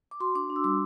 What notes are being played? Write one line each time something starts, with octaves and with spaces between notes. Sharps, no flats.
D6
F#4 C6
D4 D6
D4
E6
G3 D6